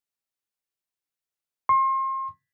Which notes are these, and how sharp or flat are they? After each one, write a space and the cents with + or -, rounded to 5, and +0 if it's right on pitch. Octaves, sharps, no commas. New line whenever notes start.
C6 +35